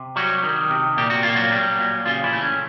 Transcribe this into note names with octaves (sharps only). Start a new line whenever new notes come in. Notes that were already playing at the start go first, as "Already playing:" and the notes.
Already playing: C3
F#3 G3 F#4
D#3
C3
A#2 G4
F#4
A#3 F4
F#3 F#4
G3
A#2
C#3 F3 F4
E3 E4
A3
C#4